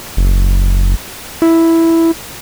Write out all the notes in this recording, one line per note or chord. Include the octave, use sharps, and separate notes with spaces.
F#1
E4